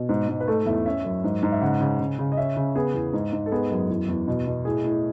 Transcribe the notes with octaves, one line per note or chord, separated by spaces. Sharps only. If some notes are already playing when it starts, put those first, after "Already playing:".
Already playing: B2
G#2
G#2
B4
A3 A4
E2 E5
C#4 E5
F#2
G#2
G#2
E5
C#3 F#5
C#3
C#3
C#3
D#5
C#4 E5
C#3
B3 G#4
E2
G#2
G#2
A4
B3 G#4
F#2
E2
E2
B2
B2
A2 G#4
A2